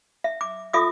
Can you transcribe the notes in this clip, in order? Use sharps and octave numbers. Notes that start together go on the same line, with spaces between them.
E5
D6
F4 A4 E5 D6 D#6